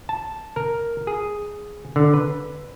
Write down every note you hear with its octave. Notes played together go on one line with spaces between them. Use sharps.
A5
A#4
G#4
D3
B4